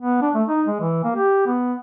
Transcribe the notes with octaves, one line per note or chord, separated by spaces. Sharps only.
B3
D4
A3
D#4
G#3
E3
A#3
G4
B3